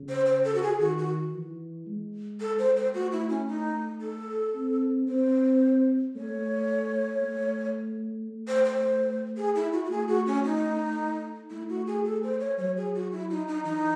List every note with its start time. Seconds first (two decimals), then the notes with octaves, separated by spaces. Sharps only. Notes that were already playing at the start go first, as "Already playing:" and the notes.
Already playing: C#3
0.09 C5
0.26 C5
0.45 A4
0.55 F#4
0.63 G#4
0.80 D#3 F#4
0.98 F#4
1.33 E3
1.87 G#3
2.40 A4
2.59 C5
2.76 C5
2.94 A3 F#4
3.12 E4
3.30 C#4
3.48 D#4
4.01 A4
4.55 C4
5.08 C4 C5
6.16 A3 C#5
7.22 A3
8.30 A3
8.48 C5
8.65 C5
9.37 G#4
9.55 E4
9.73 F#4
9.85 F#4
9.90 A3 G#4
10.08 F#4
10.27 C#4
10.44 D#4
11.51 A3 E4
11.69 F#4
11.87 G#4
12.05 A4
12.23 C5
12.40 C#5
12.58 F#3 C#5
12.77 G#4
12.95 F#4
13.12 E4
13.30 D#4
13.47 D#4
13.65 E3 D#4